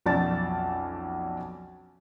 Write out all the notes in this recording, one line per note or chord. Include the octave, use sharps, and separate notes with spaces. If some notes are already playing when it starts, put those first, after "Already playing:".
B1 F2 C#4 D5 A5 A6